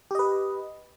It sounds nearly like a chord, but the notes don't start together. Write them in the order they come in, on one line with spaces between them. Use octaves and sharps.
G4 D#5 B4